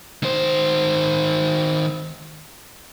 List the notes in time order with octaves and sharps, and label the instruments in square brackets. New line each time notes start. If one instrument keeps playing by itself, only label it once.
[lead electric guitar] D#3 C5